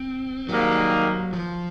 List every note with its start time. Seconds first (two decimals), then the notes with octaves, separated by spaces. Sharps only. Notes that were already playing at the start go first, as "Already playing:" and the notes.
Already playing: C4
0.49 G#2 D#3 F#3 G3 A#3
1.33 F3